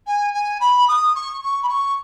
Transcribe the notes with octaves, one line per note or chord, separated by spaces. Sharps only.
G#5
G#5
B5
D#6
C#6
C#6
B5
C#6